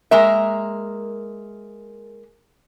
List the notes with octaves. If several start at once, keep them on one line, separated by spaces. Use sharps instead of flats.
G#3 A#3 A#4 E5